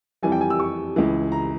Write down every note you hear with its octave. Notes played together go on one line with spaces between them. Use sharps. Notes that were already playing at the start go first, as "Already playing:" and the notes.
F2 E3 G3 G#5
G5
G#5
E6
C#6
C#2 C#3 E3
A#5